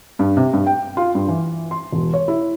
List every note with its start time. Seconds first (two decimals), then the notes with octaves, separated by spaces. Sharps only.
0.19 G2
0.37 C3
0.53 G2
0.66 G5
0.97 F4
1.15 G2
1.29 E3
1.71 C6
1.92 E1
2.14 C#5
2.28 E4